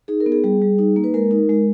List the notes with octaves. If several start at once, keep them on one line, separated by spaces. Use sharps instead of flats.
D#4 G#4
A#4
B3
G#4
G3 G#4
G3
D#4
A#3
B4
G#3 A#4
D#4
G#3